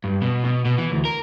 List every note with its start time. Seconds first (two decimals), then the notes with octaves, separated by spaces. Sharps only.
0.04 G2
0.22 B2
0.45 B2
0.65 B2
0.78 E3
0.92 D2
1.05 A#4